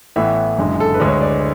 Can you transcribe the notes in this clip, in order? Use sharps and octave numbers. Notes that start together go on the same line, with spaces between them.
A1 A2 E3 B3 E5
F#1 F#2 D3 G#3
A4
B4
D2 D3 G#3
C#5
D5